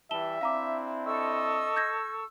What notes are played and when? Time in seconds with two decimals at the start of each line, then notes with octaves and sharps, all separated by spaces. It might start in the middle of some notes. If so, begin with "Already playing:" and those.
0.11 E3 G3 E5 A5 E7 G7
0.41 C4 D4 E4 F5 A#5 D6
1.05 A4 D#5 C#6 E6
1.76 G6 G#6 A#6